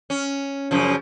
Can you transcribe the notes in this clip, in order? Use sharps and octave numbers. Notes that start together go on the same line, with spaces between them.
C#4
F#2 C#3 F3